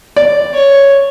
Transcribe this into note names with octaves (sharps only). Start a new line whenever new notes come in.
D5
C#5